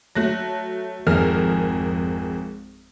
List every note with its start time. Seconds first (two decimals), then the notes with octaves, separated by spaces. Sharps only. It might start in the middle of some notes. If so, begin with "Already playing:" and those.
0.15 F#3 A3 F#6 A#6
1.07 G#1 F2 G#4 A#4 F6